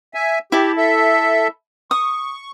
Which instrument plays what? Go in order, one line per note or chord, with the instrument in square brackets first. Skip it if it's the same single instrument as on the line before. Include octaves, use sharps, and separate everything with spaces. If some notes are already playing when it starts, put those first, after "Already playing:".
[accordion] E5 G#5
[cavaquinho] E4 A5 [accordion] G4
[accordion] A4 E5
[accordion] C#6 [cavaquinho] D#6